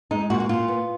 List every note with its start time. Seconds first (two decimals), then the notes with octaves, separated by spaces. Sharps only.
0.11 G#3 D#4
0.30 A#2 F#4
0.40 F#4
0.49 A#2 F4
0.68 B3